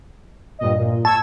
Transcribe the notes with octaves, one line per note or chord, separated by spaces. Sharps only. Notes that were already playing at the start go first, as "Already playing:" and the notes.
G2 A#2 D#5
A#2
A5 C#6 E6 G#6